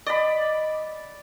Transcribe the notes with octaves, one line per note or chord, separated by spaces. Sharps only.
D5 D#5 B5